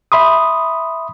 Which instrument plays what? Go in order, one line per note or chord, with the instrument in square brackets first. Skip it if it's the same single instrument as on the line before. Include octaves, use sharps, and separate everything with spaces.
[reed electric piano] E5 B5 C6 D#6